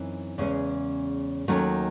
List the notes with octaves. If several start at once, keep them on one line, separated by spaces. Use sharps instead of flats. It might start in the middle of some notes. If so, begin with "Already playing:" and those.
Already playing: F#2 E3 C4 D#4
E2 C#3 G#3 C#4
D#2 D#3 F#3 A3 C#4